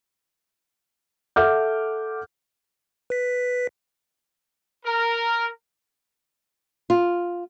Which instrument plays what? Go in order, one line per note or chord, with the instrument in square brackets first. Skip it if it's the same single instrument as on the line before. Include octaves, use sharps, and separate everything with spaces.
[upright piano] A4 E5 F#5 D6 F6 G6
[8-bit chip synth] B4 B6
[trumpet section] A#4
[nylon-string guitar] F4